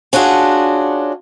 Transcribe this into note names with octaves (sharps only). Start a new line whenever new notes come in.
C#4 D4 F4 F#4 G#4